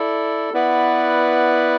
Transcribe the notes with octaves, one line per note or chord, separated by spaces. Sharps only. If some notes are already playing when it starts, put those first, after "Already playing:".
Already playing: E4 A4 D5
B3 E4 B4 D5 F#5